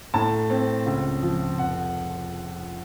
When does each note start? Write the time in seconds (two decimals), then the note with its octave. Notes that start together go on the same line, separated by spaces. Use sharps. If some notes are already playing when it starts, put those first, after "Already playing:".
0.14 A2 A5
0.50 C4
0.86 C#2
1.23 F3
1.58 F1 F#5